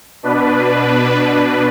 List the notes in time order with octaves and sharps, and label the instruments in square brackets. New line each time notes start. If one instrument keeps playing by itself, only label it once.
[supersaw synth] B2 D4 B4